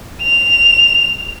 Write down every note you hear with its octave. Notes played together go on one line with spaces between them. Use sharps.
F7